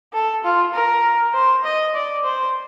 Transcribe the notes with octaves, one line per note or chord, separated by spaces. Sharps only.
A4
F4
A#4
C5
D#5
D5
C5